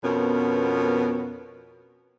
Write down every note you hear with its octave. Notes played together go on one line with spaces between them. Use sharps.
F2 B2 B3 C#4 A#4